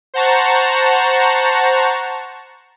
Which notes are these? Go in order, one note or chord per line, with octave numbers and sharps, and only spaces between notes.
C5 F#5 A5 A#5 C#6